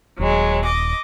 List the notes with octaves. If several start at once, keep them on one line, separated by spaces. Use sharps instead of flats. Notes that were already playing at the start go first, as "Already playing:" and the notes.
D#1 F#3 G#3
D#5 D6